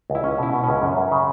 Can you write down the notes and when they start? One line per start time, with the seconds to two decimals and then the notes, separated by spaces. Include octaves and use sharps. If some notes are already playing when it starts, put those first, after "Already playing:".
0.10 C#2
0.15 E4
0.24 C#2 C#4
0.38 B2 E4
0.53 B2
0.63 C#4
0.68 C#2
0.82 F#2
0.97 F#2
1.11 C#3